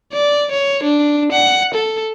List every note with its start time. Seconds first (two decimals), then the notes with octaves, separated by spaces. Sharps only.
0.13 D5
0.51 C#5
0.83 D4
1.32 F#5
1.74 A4